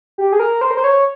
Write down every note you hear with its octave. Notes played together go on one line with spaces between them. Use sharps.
G4
G#4
A#4
C5
A#4
C5
C#5